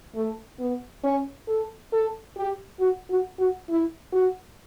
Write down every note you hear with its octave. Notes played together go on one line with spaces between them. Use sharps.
A3
B3
C#4
A4
A4
G4
F#4
F#4
F#4
E4
F#4